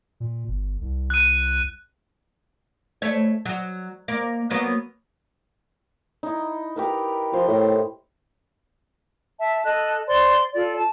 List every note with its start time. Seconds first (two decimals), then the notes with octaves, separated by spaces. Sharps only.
0.20 A#2
0.48 G1
0.81 C2
1.10 F#6 D#7
3.02 A3 C#5
3.46 F#3
4.08 A#3
4.50 F#3 A#3 B3
6.23 D#4 E4
6.76 G4 A#4 B4
7.33 F3 C5
7.48 A2
9.38 E5 A5
9.65 A4 D#5 A5 F#6
10.07 C5 D5 C6
10.53 F4 A4 D5
10.76 A5